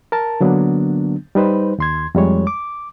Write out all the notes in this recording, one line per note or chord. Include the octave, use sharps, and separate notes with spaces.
A#4 A5
D3 F#3 A#3 B3 D4
G3 D#4 B4 C5
D#2 C6 G#6
F2 G3 G#3 C#5
D6